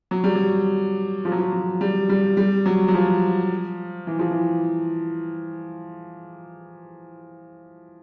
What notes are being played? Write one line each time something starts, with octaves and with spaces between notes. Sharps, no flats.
F#3
G3
F#3
F3
F#3
F3
F#3
G3
G3
G3
F#3
F#3
F3
E3
F3
E3